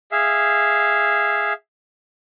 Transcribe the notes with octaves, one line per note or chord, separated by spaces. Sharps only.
G#4 E5 F5